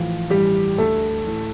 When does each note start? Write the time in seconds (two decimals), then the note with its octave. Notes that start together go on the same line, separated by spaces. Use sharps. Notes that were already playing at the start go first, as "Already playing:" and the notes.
Already playing: A1 A2 E3 F3 F4
0.30 A1 G2 E3 G3 G4
0.78 D2 D3 A3 A4
1.26 A1 A2 E3